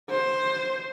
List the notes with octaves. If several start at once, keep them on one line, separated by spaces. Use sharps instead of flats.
C5